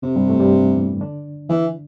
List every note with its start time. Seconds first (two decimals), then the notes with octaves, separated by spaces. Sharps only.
0.03 F2 C3 F3
0.16 G2 G3
0.28 A2 A3
0.40 G2 G3
0.76 E2 E3
1.01 D3 D4
1.49 E3